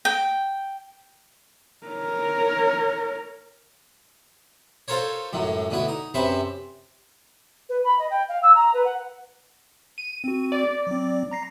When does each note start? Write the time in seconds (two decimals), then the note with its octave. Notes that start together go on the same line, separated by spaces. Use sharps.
0.05 G5
1.87 A#4 C#5
4.88 F4 A4 A#4 C5 C#5
5.33 C#2 F#2 A2 F#3
5.70 D2 B2 B3 E4
5.88 D#4
6.14 F#2 C3 B4 C5 E5
7.69 B4
7.84 B5
7.99 D#5
8.11 G5
8.29 F5
8.43 E6
8.55 A#5
8.74 B4
8.85 F#5
9.98 D#7
10.24 C4 F#4
10.52 D5
10.87 F#3 C4
11.31 A#5 A#6 C7